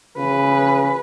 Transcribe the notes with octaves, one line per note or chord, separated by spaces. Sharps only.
C#3 B4